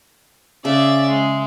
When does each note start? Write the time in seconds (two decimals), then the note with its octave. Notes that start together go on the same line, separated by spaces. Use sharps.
0.65 C#3 C#4 D5 E5
1.09 G#3